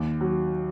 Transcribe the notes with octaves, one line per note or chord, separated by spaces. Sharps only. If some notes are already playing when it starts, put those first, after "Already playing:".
Already playing: D#2
F#3